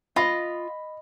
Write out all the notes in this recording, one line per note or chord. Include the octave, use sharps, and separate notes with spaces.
F4 D#5 B5